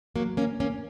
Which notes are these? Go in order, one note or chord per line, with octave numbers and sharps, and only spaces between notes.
F#3 A#3
A#3 C#4
A#3 C#4